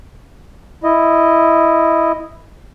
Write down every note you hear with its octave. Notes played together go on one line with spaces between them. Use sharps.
E4 D#5